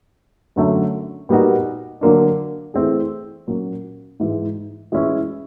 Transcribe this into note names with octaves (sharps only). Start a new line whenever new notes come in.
F#2 D3 F#3 A3 C#4
A#2 G3 B3 D#4 F#4
D3 F#3 A#3 D4
E3 A3 C4 E4 G#4
A#2 F#3 A#3 C#4
G#2 E3 G#3
E3 G#3 C#4 E4